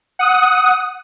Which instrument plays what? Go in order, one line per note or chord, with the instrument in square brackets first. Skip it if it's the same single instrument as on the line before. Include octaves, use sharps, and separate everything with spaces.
[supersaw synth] F#5 D#6